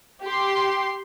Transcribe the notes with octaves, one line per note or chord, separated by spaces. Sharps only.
G4 C6